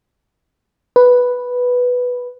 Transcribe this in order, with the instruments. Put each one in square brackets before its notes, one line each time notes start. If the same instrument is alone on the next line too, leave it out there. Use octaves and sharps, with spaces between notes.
[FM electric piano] B4